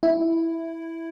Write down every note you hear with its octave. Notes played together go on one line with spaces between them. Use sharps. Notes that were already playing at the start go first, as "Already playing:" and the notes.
E4